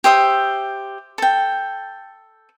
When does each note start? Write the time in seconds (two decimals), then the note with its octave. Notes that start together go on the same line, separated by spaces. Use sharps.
0.04 G4 C5 E5 D#6
1.18 A4 G5